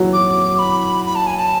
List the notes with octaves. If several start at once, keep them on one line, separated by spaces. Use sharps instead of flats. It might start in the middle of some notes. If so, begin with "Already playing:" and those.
Already playing: E3 F#3
D6
B5
B5
A5
G#5
A5